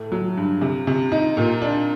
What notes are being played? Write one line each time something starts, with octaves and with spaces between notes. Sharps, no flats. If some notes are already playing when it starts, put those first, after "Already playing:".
Already playing: A2 A3
F#3
G2
C3
C3
D#4
A#2
D4